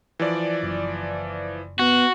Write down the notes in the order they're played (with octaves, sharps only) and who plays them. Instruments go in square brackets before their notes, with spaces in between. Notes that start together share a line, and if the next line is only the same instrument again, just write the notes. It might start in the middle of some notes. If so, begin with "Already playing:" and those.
[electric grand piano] E3 F3 D5
[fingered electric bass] F#1
[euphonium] B3 [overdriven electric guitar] F#4